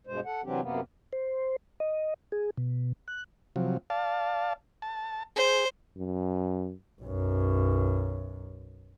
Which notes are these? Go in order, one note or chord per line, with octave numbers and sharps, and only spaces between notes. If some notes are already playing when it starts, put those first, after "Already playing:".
G2 B2 G#3 C5
A4 F#5
C3 E3 F#3 C4 D4 G4
F#2 C3 A#3 B3
C5
D#5
G#4
B2
F#6
C3 F3 F#3
D5 F5 A5
A5
G#4 C5
F#2
B1 F#2